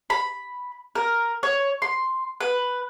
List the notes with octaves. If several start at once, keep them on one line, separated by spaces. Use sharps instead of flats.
B5
A#4
C#5
C6
B4